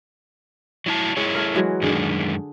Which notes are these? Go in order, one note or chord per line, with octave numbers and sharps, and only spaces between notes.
F#3 E4 A5
G#3 E4 G#4 C#5
A3 A#4
E3 F#3 G#3
F#2 D3 D#3 G#3 G#4